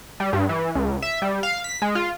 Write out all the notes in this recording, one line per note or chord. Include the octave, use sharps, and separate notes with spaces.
G3
G2
E3
C#2
E5
G3
F5
B6
G#3
F4